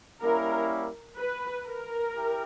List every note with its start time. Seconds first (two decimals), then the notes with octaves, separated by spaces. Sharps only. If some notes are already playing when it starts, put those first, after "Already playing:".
0.22 G3 A#3 C#4 E4 A#4
1.18 B4
1.67 A#4
2.15 E4 G4 G5